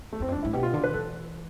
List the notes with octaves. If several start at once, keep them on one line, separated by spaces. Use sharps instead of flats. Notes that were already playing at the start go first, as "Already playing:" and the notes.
A3
E2 C4
F2
D4
G2
A2 E4
B2 G4
F4
D3 F4
B4
E3 A4